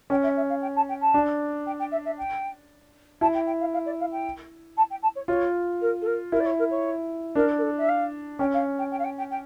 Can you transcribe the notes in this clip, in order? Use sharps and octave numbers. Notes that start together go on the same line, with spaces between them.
C#4 G5
E5
E5
F5
G5
A5
G5
A5
D4
G5
G5
E5
E5
G5
E4 A5
G5
G5
F5
F5
D5
F5
G5
A5
G5
A5
C#5
F4 C#5
A#4
A4
A#4
E4 A#4
D5
C#5
A#4
C#5
D4 A#4
A#4
A4
E5
F5
C#4 G5
F5
G5
G5
F5
G5
G5
G5